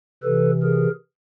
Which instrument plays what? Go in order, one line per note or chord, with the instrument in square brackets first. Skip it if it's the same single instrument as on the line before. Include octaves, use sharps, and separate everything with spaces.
[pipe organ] C3 E3 A4 B4
G#4 A#4